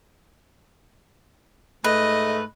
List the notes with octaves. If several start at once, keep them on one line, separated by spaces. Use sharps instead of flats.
G#2 A3 B4 D#5